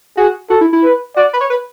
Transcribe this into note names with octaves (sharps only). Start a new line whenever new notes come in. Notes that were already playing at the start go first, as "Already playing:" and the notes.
F#4 G#4
F#4 A4
E4
E4
B4
F#4 D5
B4
C#5
B4